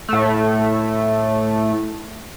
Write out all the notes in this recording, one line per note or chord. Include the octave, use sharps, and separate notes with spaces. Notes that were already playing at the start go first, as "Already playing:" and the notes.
A2 A3